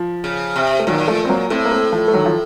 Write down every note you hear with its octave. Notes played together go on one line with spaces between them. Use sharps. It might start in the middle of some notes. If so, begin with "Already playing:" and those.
Already playing: F3
C#3
C3
A3
A#2 D#3 F#3
F3 A3
C4
F#3 A#3
A2 A3 C4
A#3
A3 C4
F3 A3
A3
D#3 F#3
F3